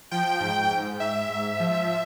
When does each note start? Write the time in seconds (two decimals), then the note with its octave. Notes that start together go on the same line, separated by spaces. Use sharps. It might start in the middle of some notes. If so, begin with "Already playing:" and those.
0.11 F3 G5
0.40 G#2
0.71 G#2
1.00 G#2 E5
1.30 G#2
1.60 F3